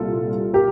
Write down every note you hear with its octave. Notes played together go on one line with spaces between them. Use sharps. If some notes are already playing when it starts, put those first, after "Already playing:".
Already playing: C2 A#2 G3 F4 A4
G4 A#4